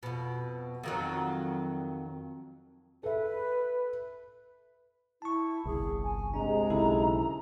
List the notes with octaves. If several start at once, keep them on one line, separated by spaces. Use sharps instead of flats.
F2 B2
F2 D#3 F#3
A4 B4 E5
E4 A5 C#6
G1 C2 G#4
G#5
C3 G#3 D4 A#5
B1 C#3 D#4 E4 A4